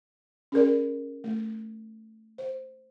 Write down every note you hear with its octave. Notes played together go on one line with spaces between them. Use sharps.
C#4 G#4 A#4 D5
A3
C5